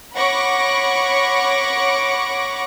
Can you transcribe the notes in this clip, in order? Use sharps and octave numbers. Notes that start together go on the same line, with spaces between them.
C#5 F#5 B5 C#6 D6 A#6